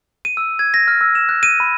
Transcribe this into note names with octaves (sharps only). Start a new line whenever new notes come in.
D#7
E6
G#6
A#6
F6
E6
E7
F#6
D#7
B5